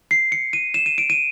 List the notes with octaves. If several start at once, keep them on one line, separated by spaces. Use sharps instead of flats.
C7
C#7
D#7
E7
D#7
D7
D#7